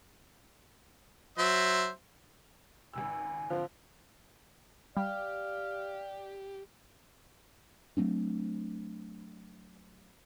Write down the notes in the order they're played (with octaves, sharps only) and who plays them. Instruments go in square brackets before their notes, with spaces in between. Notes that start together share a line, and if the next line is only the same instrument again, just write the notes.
[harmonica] F#3 C5 E5
[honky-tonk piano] G#1 C#2 E6 [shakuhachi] G#5
[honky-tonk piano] D3 C4 [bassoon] F3
[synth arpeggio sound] G3 [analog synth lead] G4 [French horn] D5 [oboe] F5
[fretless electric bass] F#3 A3 C4 D4